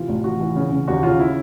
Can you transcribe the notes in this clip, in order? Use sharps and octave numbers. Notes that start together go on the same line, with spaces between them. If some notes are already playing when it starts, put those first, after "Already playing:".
Already playing: C3 E3 F4
A1
E3 F#4
E3
C#3
C#3
D#2 F#4
C#3 F4
E4